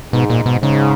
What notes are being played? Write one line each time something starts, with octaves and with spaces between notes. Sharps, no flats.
G#2 B2
A#2
B2
G#2 C#3